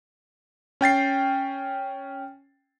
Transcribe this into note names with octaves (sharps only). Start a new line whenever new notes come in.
C#4 G5 A6 C7